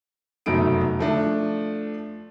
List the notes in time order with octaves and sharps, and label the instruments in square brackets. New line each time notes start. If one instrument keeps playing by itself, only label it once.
[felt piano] F1 F#2 B2 A3 D#4 D7
F3 A3 D4